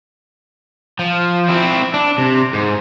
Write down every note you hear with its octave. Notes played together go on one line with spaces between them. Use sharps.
F3
C4 E4
D4
C3
G#2